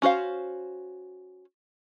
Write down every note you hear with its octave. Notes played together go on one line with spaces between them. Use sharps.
C#4 F#4 C5 F5